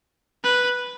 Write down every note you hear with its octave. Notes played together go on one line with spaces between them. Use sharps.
B4